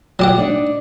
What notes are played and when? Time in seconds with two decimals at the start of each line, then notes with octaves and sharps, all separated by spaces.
0.19 F#3 G4 F#5
0.38 D4 D#4 D5